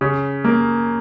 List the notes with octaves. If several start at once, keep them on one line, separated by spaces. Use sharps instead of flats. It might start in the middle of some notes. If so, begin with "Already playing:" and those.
C#3
A#3